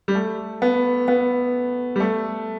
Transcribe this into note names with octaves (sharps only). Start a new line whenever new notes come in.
G3
A3
B3
B3
G3
A3